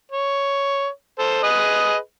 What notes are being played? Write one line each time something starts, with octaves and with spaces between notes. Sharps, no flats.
C#5
A4 C5
G#4 B4 D#5